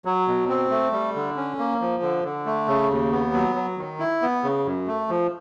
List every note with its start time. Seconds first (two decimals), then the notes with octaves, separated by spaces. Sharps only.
0.05 F#3
0.28 B2
0.49 C4
0.71 A3
0.93 G3
1.15 D3
1.36 C#4
1.59 A#3
1.81 F3
2.03 D3
2.24 D3
2.46 A3
2.68 C#3
2.90 D#2
3.12 B3
3.33 F#3
3.56 F#3
3.78 D#3
4.00 E4
4.22 B3
4.44 C#3
4.65 F#2
4.87 A3
5.09 F3